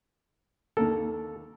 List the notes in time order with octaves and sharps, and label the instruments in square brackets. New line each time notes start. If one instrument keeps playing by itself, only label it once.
[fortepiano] D#2 A#3 A#4 [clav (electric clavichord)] A4